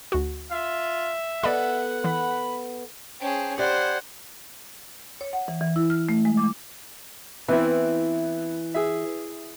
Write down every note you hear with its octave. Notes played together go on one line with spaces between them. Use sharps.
D2 F#4
F4 E5
B3 A4 D5 D#5 F#5 B5
E3 B5
C#4 G#4 C5 G5 A5
G4 C5 D5 F#5 B5 G6 G#6
C#5
F#5
E3
E3
E4
F6
A3
G#3
D6
E3 B3 C4 E4
G#4 E5